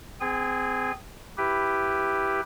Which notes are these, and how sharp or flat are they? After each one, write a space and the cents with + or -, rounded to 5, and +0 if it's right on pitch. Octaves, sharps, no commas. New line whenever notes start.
C4 -30 G#4 +0 G#5 -30
E4 +0 G4 +0 B4 +0